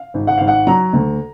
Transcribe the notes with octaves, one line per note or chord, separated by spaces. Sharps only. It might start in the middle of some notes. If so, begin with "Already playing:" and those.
Already playing: F5
G#1
F#5
G#1 F5
F#5
F#3 A#5
D2